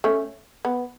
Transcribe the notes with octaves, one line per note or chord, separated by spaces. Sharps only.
A3 C#4
B3